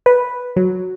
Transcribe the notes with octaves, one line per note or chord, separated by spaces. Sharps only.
B4
F#3